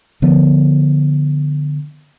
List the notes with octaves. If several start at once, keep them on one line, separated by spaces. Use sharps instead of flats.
D3 F3 B3